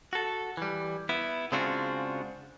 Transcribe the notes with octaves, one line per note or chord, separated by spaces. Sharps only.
F#4 A4
E3 G3
B3 E4
C#3 G#3 C4 D4 F4 F#4